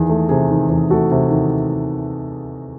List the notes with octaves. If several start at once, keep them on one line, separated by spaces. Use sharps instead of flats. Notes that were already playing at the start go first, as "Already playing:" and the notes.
Already playing: E2 D#3 G#4
A3
C3 G#4
D#3
E2
A3 F#4 A4
C3
D#3